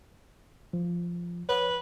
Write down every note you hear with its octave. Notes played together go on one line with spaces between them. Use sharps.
F3
B4 C#5